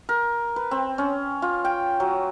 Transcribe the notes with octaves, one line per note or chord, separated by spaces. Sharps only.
A#4
B4
C4
C#4
F4
G5
F#3